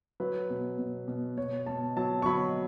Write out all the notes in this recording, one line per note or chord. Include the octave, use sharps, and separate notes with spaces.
F#3 B4
B2
B2
B2
B2 C#5
B2 A5
F#3 A5
C#6
F#3 B5